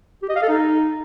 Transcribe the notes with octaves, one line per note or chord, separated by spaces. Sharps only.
G4
D#5
F5
A4
D#4